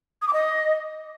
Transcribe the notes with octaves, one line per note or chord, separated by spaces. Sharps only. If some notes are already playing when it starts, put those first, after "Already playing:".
D#6
D6
D#5